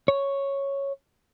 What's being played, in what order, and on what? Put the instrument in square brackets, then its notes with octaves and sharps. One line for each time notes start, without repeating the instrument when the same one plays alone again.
[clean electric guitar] C#5